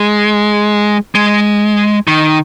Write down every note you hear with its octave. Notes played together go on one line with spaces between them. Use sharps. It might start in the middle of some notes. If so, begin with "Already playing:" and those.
Already playing: G#3
G#3
D#3